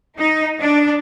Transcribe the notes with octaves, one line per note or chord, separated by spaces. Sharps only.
D#4
D4